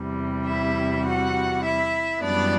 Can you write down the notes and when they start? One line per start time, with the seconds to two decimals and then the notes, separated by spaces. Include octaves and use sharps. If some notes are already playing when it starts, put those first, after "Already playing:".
Already playing: E2 C3 G3
0.46 E4 E5
1.05 F#4 F#5
1.63 E4 E5
2.22 F#2 E3 G3 B3 D4 D5